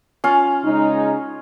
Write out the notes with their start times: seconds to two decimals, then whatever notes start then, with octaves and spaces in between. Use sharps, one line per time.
0.24 C#4 F4 F5
0.65 C#3 G#3 D#4